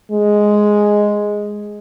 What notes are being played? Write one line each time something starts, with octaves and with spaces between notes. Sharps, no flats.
G#3